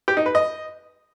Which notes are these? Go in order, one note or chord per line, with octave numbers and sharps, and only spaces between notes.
G4
D#4
B4
D#5